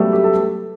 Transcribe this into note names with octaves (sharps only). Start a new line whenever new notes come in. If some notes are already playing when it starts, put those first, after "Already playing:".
Already playing: F#3 G3 A3 B3 F#4 G4 A4
G3 G4
A4